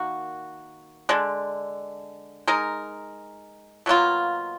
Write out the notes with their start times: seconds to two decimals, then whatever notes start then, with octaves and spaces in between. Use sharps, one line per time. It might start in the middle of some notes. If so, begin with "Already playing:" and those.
Already playing: D#3 A#3 F#4
1.09 D3 G#3 D4
2.47 G#3 D#4 A#4
3.86 B2 F#3 A#3 F4